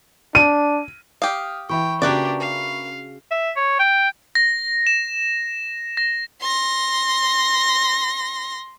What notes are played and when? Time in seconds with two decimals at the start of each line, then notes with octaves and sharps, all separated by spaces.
0.35 D4 D#7
1.22 G4 F5 D#6 F6
1.70 E3 E5 G5 B5 C#6
2.02 C#3 A#3 D4 F#4 G4 B4 D5
2.40 F5
3.31 E5
3.56 C#5
3.79 G5
4.35 A#6
4.87 E7
5.97 A#6
6.41 C6 A#6